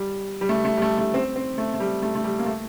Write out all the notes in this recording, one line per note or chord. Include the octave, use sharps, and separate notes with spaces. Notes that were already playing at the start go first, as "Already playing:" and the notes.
Already playing: G3
G3
A3
A3
G3
A3
A3
C4
C4
A3
A3
G3
A3
A3
G3
A#3
A3